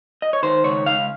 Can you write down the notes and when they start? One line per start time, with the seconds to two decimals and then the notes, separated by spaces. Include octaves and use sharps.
0.22 D#5
0.33 C#5
0.43 D#3 C5
0.64 C#2 C#5
0.86 C#2 F5